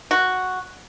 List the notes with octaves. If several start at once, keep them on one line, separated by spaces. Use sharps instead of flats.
F#4